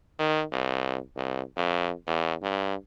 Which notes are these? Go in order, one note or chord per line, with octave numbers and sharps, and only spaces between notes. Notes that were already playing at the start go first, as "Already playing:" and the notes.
D#3
C2
C2
F2
E2
G2